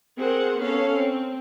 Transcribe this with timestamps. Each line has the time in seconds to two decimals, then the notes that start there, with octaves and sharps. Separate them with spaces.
0.18 C4 G#4 A#4 C5 F#5
0.60 B3 C#4 A4 C#5 F5
0.96 C4